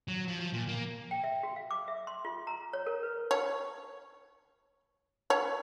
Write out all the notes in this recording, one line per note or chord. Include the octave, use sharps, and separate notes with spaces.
F#3
F3
F3
A#2
A#3
G5
E5
F#4
F5
D6
E5
C6
F4
A#5
C#5
A#4
B4
C#5
C#5